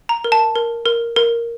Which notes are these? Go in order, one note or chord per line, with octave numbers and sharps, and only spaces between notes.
A#5
A#4
A5
A#4
A#4
A#4